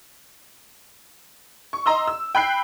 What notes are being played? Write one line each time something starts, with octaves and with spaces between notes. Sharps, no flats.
C#6
D#5 A#5 C6 E6
E6
G5 B5 F#6 C7